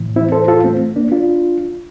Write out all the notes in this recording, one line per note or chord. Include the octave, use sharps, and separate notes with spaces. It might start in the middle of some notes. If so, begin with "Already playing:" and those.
Already playing: A2 E3
C4 E4
A4 C5
F4 A4
A3 C4
A#3 D4
D4 F4